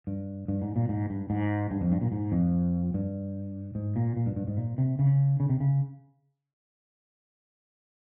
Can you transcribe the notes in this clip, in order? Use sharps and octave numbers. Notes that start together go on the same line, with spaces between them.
G2
G2
G#2
A#2
G#2
G2
G#2
G2
F2
G2
A#2
G#2
F2
G2
G#2
A#2
A#2
G2
G2
G#2
A#2
C3
C#3
C#3
C3
C#3